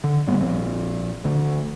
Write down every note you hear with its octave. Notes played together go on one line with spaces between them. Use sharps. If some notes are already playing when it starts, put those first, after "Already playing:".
D3
G#2 G3 A#3 B3
A#1 F3 C4
D2 D3